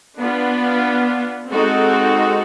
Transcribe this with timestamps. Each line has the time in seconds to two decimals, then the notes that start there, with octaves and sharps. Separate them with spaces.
0.20 B3 D4 F4
1.51 G#3 C4 D#4 F#4 A4